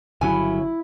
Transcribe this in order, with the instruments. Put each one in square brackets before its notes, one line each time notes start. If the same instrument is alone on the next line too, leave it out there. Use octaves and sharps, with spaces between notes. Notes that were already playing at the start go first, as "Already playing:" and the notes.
[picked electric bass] G1 C#3 F#3 [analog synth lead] E4 [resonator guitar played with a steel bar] G#5